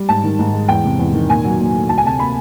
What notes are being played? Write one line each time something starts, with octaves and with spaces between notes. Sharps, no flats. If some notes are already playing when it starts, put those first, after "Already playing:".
Already playing: G3
G#2 A5
D#3
G#2
G#3
E2 G5
C3
E2
D#3
A#2 G#5
F#3
A#2
A3
D2 A5
G#5
C3 A5
A#3 B5